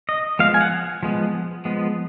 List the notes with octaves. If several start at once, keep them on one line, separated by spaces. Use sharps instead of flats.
D#5
F3 G#3 B3 F5
G#5
F#5
F3 G#3 B3
F3 G#3 B3